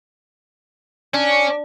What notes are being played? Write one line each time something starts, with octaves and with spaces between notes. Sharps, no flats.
C#4 D4